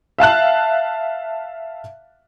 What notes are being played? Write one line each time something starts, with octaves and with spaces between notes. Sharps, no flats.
E5 F5 A5 F#6